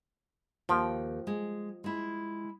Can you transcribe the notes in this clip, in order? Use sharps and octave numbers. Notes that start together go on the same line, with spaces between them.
D#2 F3 G5
G#3
G#3 E4